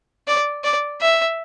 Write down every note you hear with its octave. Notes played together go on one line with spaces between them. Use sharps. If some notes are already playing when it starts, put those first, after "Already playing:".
D5
D5
E5